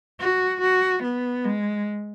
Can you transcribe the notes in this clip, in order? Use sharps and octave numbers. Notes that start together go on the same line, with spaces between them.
F#4
F#4
B3
G#3